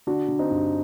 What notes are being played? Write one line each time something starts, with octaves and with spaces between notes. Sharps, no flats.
D3 D4 F#4
D3
C4 D#4
G2